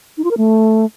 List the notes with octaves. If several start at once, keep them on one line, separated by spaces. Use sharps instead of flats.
D#4
F4
A#4
A3